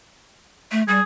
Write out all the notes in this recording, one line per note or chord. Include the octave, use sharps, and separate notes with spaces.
A3
G3 G#4